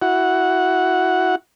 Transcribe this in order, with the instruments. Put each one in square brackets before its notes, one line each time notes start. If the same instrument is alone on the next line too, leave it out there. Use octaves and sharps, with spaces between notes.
[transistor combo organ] E4 F#4 F#5